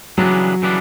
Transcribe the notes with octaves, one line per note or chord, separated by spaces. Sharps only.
C#3 E3 F#3 G3 B3 D4
C#3 E3 G3 B3 D4